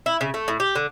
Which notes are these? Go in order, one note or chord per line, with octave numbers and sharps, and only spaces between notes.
E4
C#3
A3
A2
G4
D3